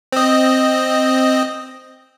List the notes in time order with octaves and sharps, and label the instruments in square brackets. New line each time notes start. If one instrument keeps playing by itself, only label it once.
[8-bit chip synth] C4 D#5